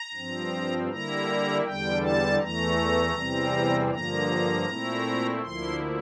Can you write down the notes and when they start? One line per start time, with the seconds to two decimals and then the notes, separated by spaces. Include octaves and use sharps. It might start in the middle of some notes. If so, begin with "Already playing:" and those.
Already playing: A#5
0.14 G2 F3 C4
0.89 D3 G3 A#3 E4 A#5
1.64 E2 D3 G3 G5
2.02 A5
2.39 E2 E3 A3 A#5
3.15 E2 C3 E3 G3 C4
3.90 G2 D3 F3 A#3 A#5
4.66 A#2 A3 C4 E4
5.41 D2 D3 F3 A#3 E4 C6